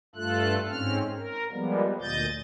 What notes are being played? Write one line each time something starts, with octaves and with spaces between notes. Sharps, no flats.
G2 A3 F4 A4 F#6
G#2 C4 C#4 F6
A#4
F3 G3 G#3 A#3 B3
D2 A#2 D#5 G6 A6